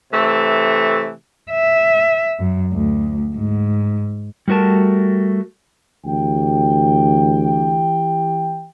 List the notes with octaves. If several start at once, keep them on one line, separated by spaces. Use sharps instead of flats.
C3 E3 A3
E5
F#2
D2
G#2
G3 A3 F#4 A#4 A5
D2 E3 G4 G5